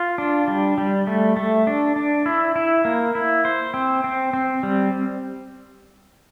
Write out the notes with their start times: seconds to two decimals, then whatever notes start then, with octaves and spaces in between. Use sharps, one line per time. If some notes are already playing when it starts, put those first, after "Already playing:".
Already playing: F4
0.18 D4
0.48 G3
0.78 G3
1.07 A3
1.37 A3
1.67 D4
1.96 D4
2.26 E4
2.56 E4
2.85 A#3
3.15 E4
3.45 C5
3.74 C4
4.04 C4
4.33 C4
4.63 G3